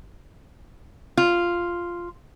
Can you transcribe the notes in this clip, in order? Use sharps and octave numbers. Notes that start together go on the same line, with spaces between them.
F4